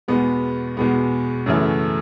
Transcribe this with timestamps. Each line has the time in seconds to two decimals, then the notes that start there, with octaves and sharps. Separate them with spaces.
0.08 E2 B2 G#3 B3
0.77 E2 B2 G#3 B3
1.46 F#2 C#3 E3 A3